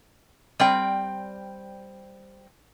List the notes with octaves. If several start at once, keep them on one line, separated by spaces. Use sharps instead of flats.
G3 C4 G5